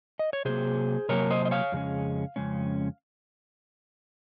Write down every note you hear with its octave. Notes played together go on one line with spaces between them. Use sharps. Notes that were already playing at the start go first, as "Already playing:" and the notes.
D#5
C#5
C3 F#3 A#3 G#4 C5
C3 F#3 A#3 A#4 C#5
C5 D#5
D#5
C#5 F5
F2 C#3 G#3 C#4
F2 C#3 G#3 C#4